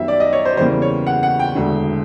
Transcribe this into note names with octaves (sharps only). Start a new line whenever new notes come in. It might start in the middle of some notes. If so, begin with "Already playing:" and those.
Already playing: F#2 D#3 G3 B3 E5
D5
D#5
C#5
C5
E2 C#3 E3 G3 A#3 C5
C#5
F#5
F#5
G5
E1 D2 D3